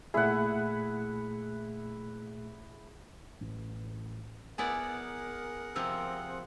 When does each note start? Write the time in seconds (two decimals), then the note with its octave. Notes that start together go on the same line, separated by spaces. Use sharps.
0.14 A#2 A3 E4 G#4 F#5
3.41 A1
4.58 B3 E4 G#4 A#4 D5 F#5 G#5
5.76 C3 F3 C4 E6